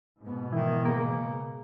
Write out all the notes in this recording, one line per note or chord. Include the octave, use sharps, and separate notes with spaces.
G#2 B2 B3
D#3 E3
C#3 A#3